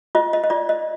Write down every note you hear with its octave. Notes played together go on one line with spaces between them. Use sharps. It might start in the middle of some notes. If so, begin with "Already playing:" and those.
F4 D#5
D#5
D#5
F4 D5
D#5